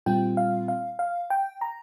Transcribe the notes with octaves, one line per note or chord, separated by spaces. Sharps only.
A#2 G3 C4 F4 G5
F5
F5
F5
G5
A#5